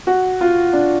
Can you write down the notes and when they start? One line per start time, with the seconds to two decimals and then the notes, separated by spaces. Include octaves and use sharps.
0.07 F#4
0.41 F4
0.73 D4